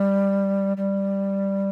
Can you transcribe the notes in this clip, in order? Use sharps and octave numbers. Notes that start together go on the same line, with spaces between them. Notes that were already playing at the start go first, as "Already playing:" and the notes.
Already playing: G3
G3